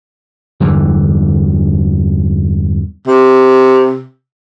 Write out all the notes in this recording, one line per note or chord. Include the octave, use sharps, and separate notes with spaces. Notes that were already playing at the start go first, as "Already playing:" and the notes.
E2 G2 D3 E3
C3